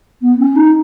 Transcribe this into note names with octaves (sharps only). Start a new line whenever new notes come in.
B3
C#4
D#4